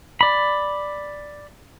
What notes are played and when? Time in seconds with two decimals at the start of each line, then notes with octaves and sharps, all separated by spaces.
0.21 D5 B5